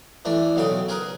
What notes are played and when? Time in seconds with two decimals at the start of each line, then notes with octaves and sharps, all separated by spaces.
0.25 E3 A3 D4
0.56 B1 C#3 F#3 A4 G5 D#6
0.88 G#4 A#4 B4